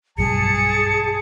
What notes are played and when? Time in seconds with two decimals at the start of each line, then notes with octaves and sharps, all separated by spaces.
0.18 B1 G2 F#3 G#4 A5 C#7